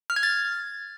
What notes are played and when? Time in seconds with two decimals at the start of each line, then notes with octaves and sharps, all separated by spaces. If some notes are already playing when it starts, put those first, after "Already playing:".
0.10 F6
0.16 G#6
0.23 A6